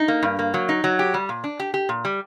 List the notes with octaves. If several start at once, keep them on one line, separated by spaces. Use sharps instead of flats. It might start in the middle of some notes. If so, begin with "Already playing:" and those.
Already playing: D#4
A#3
G2
A#3
F#3
D#4
F#3
G4
G3
A#2
D4
G4
G4
A#2
G3